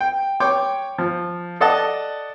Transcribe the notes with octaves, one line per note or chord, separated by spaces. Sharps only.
G5
C#5 G5 C6 D6
F3
A4 D5 D#5 F#5 A5